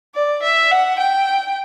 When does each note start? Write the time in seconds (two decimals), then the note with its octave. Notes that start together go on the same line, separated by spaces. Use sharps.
0.15 D5
0.43 E5
0.71 F#5
1.00 G5